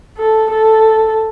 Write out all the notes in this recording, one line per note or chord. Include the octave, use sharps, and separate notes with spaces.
A4
A4